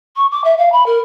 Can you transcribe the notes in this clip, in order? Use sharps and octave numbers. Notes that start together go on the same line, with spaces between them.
C#6
D6
E5
F5
B5
A#4